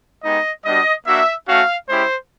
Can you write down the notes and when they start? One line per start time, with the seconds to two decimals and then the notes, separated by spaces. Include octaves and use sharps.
0.24 G#3 B3 D#4 G4 D#5
0.65 G3 B3 D4 F#4 D#5
1.06 A#3 D4 F#4 E5
1.48 A3 C#4 F#4 F5
1.89 G#3 C#4 E4 G4 C5